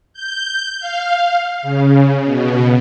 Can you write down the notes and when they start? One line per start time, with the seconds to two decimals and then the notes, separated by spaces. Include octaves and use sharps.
0.13 G6
0.80 F5
1.62 C#3
2.24 B2